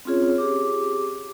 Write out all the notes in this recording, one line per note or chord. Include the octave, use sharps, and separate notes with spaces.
C4 C#4 F4 G#4 C#5
G4 G#4 D6